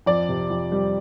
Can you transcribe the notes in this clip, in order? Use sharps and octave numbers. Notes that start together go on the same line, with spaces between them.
F2 D5
C3
F2
G3